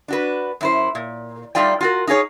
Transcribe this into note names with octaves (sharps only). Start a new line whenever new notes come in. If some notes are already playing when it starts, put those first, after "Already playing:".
D4 F#4 B4
F#2 E4 C5
A#2
G3 A3 D#4 F4 D5 G5
F4 F#4 A#4
D#4 F4 G#4 C#5